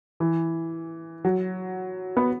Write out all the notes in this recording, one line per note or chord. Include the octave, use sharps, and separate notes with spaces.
E3
F#3
B3